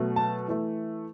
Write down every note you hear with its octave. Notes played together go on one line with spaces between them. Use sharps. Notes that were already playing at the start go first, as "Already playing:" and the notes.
Already playing: B2 F#3 A3
A5
E3 A3